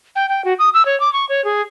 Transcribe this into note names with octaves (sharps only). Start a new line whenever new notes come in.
G5
G5
F#4
D#6
E6
C#5
D6
C#6
C#5
G#4